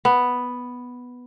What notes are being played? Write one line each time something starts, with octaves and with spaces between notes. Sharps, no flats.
B3